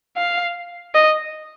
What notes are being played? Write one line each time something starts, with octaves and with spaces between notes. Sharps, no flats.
F5
D#5